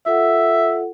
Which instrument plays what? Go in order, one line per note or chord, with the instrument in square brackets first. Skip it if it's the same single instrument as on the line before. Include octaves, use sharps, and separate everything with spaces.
[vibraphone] F4 A4 F#5 [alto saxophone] E5